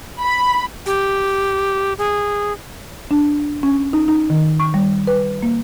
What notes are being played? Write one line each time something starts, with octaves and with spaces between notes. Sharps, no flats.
B5
G4
G#4
D4
C#4
D#4
D#4
D#3
C#6
G3
B4
A#3